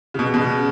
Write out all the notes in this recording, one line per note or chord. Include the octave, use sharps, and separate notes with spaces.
C#3
B2
B2
C#3